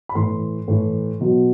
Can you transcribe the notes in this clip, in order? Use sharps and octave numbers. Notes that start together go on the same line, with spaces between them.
B5
A2 E3 C6
A2 E3
B2 F#3